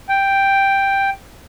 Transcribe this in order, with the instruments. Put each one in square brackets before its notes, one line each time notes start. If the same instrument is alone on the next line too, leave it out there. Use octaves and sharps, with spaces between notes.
[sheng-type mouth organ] G5